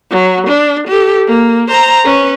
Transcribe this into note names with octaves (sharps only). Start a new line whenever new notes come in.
F#3
D4
G4 A4
A#3
C5 A#5
C#4 B4